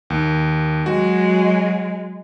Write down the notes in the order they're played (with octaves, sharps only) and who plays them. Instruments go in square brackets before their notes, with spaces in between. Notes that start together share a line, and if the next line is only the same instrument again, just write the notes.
[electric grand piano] D#2
[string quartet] F#3 G#3 [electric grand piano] F#4